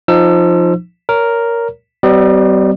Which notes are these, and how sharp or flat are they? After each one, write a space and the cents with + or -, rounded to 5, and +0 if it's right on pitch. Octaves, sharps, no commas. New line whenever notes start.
F3 +0 D#4 -15 E6 +30
A#4 +0 C#5 +25
G3 -35 C4 -45 D5 +40